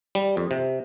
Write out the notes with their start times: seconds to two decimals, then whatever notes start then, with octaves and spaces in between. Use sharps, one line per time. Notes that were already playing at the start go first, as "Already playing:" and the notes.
0.15 G3
0.37 F2
0.51 C3